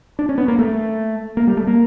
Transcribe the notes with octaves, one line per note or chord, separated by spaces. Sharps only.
D4
C#4
B3
A#3
A3
A#3
G3
A3
A#3